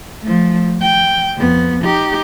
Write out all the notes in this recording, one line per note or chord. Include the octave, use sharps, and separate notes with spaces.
F3 A3
G5
F2 B3
D#4 G4